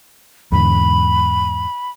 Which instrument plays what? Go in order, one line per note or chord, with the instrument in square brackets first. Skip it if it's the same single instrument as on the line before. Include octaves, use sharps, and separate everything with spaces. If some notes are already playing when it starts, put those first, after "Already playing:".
[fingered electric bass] E2 G#2 D3 [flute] B5